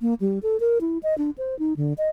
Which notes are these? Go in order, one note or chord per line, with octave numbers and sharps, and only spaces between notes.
A#3
G3
A4
A#4
E4
D#5
D4
C5
D#4
D3
D#5